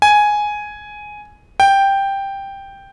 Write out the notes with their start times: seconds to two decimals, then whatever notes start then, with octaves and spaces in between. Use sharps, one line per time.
0.02 G#5
1.60 G5